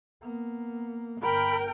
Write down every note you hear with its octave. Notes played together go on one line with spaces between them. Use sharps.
A#3 B3
G1 A#4 G5 B5